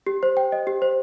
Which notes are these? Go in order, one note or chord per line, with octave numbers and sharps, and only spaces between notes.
G4
C5
G5
D#5
G4
C5